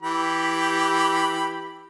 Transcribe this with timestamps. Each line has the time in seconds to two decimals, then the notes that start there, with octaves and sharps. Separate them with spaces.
0.03 E3 G4 B5